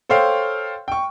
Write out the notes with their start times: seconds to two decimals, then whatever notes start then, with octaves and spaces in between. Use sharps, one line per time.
0.09 A4 C5 C#5 F5 G5
0.88 G5 C#6